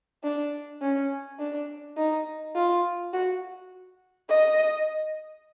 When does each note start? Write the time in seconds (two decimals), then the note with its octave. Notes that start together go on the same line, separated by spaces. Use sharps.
0.24 D4
0.82 C#4
1.39 D4
1.97 D#4
2.55 F4
3.13 F#4
4.29 D#5